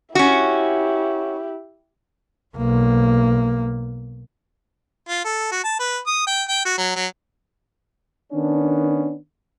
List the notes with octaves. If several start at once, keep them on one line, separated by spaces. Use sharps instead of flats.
C#4 E4 F#4 G4
B1 A#3
F4
A4
F#4
A5
B4
D#6
G5
G5
F#4
F#3
F#3
D#3 B3 C#4 D4